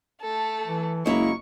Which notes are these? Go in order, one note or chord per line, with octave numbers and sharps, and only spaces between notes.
A3 A4
E3
F#1 G#3 A#3 E4 A#5 C#6